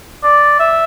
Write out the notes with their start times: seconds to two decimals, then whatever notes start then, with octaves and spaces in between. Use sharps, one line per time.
0.23 D5
0.60 E5